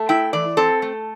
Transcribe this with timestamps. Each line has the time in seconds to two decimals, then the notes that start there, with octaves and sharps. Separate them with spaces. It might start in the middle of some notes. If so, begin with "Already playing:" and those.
Already playing: A3
0.09 E4 G5
0.33 E3 D5
0.57 C4 A4
0.82 A3